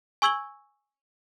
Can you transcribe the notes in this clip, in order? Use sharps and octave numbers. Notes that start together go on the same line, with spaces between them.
G#5 C#6 E6 G#6 F#7 G7